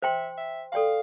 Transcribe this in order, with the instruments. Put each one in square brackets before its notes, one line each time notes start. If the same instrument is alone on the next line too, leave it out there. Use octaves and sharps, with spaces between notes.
[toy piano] C5 G5 C6 [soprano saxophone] E5
[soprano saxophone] E5
[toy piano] A4 D5 G5 C6 [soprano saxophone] F5